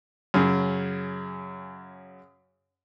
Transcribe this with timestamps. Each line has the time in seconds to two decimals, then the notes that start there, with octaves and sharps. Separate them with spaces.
0.34 F#2 C#3